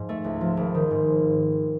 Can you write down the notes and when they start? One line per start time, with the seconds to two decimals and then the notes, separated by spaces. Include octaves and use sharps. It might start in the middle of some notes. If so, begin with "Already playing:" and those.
Already playing: G#2 F3
0.09 A3
0.24 C#2
0.41 F3
0.57 G#1
0.74 D#3
0.91 G#2